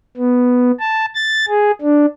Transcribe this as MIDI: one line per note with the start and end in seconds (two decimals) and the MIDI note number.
0.17 0.71 59
0.79 1.05 81
1.15 1.45 93
1.48 1.71 68
1.81 2.06 62